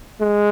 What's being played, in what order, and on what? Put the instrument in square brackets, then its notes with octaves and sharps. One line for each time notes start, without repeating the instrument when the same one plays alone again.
[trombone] G#3